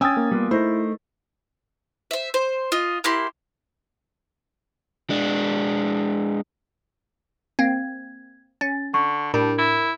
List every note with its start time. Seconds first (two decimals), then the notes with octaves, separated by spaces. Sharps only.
0.01 C#4 G5 G#5 D#6 E6 A6
0.17 A#3
0.31 G3 B3 F4
0.51 A3 D#4 E4 A#4 C5
2.11 C5 E5
2.34 C5
2.72 F4 D#5
3.04 A#3 E4 G4 C6
5.10 G#3 D4
7.59 A#3 C4 G#6
8.61 C#4 A6
8.94 D3 C#6
9.34 A2 G3 D4 A#4
9.58 E4